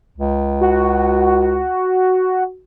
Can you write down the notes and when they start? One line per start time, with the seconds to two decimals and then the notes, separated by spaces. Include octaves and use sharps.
0.18 C#2
0.61 F#4